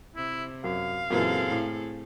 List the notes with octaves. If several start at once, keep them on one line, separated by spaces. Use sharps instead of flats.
C3 E4
F#2 F5
F#2 A#2 E3 C4 G#4 A4
A2